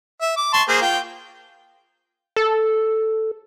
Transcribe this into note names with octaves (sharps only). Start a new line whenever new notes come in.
E5
D6
A5 C6 C#6
A#3 G#4 C5
F4 G5
A4